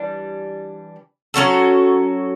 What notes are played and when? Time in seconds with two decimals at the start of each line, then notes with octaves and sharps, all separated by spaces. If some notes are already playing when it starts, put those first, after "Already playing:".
Already playing: E3 G3 D4
1.34 F#3 C#4 F#4 A4